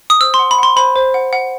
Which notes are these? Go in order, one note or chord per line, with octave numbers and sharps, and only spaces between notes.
D#6
C5 E6
C6
F#5
B5
F#5 C6
C5 B5
C5
F#5
F#5